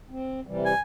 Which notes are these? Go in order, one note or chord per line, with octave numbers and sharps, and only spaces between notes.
C4
C3 E3 G3
G#5